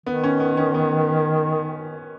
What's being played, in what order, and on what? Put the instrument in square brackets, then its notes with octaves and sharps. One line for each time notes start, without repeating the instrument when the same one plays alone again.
[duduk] D#3 [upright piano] B3
[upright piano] C#4
B3
C#4
B3